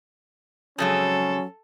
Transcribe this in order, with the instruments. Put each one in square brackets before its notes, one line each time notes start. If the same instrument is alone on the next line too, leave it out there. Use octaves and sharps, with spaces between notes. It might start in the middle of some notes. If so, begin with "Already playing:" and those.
[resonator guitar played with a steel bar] F2 C#3 G#3 [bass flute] F#3 [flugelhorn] C#4 [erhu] A4